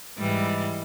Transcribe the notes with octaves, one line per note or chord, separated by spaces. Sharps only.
G#2 E3 G3